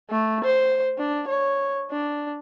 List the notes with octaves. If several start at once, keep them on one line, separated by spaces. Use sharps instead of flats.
A3
C5
D4
C#5
D4